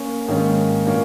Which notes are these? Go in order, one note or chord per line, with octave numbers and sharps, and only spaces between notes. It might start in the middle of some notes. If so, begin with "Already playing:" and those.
Already playing: A#3 C#4
G#2 D#3 A#3 C#4
A#2 A#3 C#4